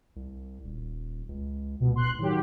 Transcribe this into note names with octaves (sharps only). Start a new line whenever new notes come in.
C2
D#1
C#2
C#2 B2
F1 C6 F#6
A2 D#3 F#3 G4